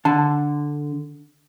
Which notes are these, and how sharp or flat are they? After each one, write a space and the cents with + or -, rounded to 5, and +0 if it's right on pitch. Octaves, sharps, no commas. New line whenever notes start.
D3 +0 A5 +0